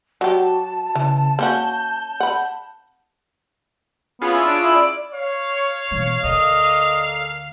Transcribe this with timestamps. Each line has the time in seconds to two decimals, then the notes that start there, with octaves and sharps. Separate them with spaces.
0.21 F#3 F#4 G4 A5
0.95 C#3 E3
1.39 A#3 C#4 F#4 G6
2.20 F#5 B5
4.22 B3 C#4 F4 G#4
4.33 E4
4.46 D4
4.62 E4
4.76 D5
5.15 C#5 F5
5.91 B2 E3
6.24 D2 A4 A#4 D5 D#5